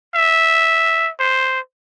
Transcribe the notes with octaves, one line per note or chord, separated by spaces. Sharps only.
E5
C5